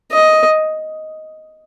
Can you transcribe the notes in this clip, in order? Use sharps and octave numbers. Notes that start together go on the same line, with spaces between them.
D#5